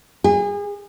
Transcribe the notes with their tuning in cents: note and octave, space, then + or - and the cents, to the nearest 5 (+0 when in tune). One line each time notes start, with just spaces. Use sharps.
G#4 -35